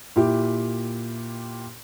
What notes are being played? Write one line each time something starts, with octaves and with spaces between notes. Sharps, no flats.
A#2 E4 G4